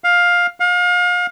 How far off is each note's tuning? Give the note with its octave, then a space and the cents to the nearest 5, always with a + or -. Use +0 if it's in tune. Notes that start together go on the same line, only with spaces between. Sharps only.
F5 +15
F5 +35